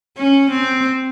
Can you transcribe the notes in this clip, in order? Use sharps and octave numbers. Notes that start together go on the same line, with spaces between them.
C#4
C4